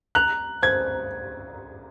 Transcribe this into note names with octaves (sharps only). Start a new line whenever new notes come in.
A#5 F#6
C5 G#6